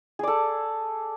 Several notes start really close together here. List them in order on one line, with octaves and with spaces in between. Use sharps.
G#4 D5 A4